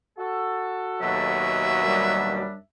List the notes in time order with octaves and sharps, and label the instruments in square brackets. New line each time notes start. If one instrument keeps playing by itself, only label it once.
[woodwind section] F#4 A4
[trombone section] D#2 B2 F#3 [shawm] E5
[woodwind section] F#2 G3 D4